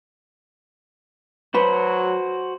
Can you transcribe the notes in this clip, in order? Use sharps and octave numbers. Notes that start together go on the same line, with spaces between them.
F#3 F#4 B4 C5